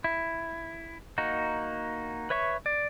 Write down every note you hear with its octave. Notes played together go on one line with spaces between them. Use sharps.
E4
A#3 D#4 F#4
B4 C#5 E5 C#6
D5